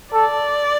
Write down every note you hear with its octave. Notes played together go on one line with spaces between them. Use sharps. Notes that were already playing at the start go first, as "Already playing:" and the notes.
A4 D5